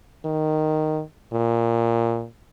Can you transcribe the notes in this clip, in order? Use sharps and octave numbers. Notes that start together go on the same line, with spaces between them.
D#3
A#2